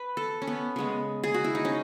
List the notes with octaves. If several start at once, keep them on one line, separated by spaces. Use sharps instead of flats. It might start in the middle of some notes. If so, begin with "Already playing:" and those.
Already playing: B4
A4
C#4
B3
C#3 G#3 B3
G#4
F#4
E4
D#4
C#4